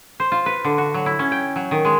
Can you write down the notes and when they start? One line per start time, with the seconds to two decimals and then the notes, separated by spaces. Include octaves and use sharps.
0.20 C5
0.32 F4
0.46 B4
0.64 D3
0.78 F#4
0.94 F#3
1.06 E4
1.19 C#4
1.32 G5
1.56 F#3
1.71 D#3
1.85 G#3